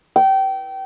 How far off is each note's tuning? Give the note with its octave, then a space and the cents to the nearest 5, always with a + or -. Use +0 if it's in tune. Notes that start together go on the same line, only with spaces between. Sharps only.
G5 -25